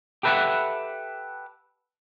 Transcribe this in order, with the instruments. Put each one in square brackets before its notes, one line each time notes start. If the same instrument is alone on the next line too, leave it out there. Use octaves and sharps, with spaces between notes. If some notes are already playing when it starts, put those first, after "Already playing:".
[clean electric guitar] G4 A4 B4 D#5 E5 F#5